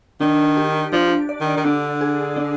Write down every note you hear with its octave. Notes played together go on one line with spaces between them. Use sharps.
D#3 D4
G4
F3 D4
D5
D#3
D#3
D3 D4
G#4
D4